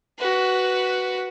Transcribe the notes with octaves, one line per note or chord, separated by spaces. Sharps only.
F#4 B4